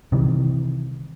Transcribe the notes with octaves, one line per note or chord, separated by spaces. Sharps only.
C3 D#3 E3 G3